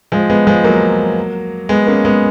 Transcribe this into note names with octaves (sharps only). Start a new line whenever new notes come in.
F3 G#3
G#3 B3
F3 G#3
F#3 A#3
G#3 B3
A#3 C#4
G#3 B3